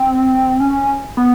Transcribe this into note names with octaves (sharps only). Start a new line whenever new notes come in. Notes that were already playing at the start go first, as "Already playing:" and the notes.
Already playing: C4
C#4
B3